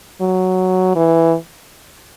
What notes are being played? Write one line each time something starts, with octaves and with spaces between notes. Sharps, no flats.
F#3
E3